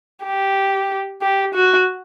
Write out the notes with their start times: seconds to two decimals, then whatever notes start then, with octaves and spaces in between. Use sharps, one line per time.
0.26 G4
1.22 G4
1.54 F#4